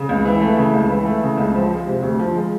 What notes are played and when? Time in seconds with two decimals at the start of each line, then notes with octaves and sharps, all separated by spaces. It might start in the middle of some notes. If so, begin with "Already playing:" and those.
Already playing: C#3
0.09 C#2
0.25 E3
0.41 A3
0.57 C#3
0.74 C#2
0.89 E3
1.05 A3
1.22 C#3
1.38 C#2
1.54 F3
1.71 G#3
1.87 C3
2.02 D2
2.19 F3
2.34 G#3